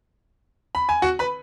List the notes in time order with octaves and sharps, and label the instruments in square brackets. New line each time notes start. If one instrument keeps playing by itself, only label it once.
[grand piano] B5
G#5
F#4 F#5
B4 B5